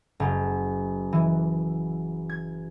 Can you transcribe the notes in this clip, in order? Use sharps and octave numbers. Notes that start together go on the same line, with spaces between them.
F#1
E3
G#6